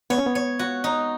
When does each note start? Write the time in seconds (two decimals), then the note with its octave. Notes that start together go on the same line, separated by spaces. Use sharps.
0.10 B3 C#5
0.18 C#4
0.26 B3
0.35 C#5
0.59 F#4
0.84 D#4